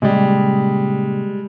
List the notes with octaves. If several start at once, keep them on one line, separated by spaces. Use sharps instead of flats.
A#2 C#3 G3 G#3 D#5